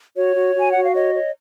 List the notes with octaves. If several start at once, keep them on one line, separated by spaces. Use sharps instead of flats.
F#4 C#5
F#4
F#4
G#5
F#4 F#5
F5
C#5 D#5
C#5